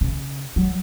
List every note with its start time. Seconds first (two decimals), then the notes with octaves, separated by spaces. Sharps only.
0.01 C#3
0.56 F#3